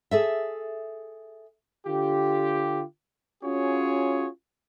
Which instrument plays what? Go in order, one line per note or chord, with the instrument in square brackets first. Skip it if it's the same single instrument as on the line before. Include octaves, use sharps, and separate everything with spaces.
[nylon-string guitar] G#4 A4 E5
[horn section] D3 F4 G4
C#4 F4 F#4 G#4 C#5